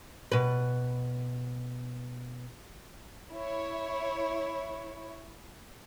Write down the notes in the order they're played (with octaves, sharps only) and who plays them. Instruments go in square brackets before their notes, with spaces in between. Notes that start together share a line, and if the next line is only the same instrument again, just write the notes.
[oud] B2 B4
[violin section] E4 C#5